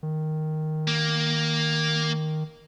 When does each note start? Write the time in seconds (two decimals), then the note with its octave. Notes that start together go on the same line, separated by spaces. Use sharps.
0.03 D#3
0.88 A#3